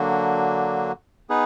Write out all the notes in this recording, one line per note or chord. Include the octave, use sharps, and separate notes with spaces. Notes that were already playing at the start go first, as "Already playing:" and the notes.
Already playing: D3 F#3 A#3 D4 F#4
B3 D#4 G#4 B4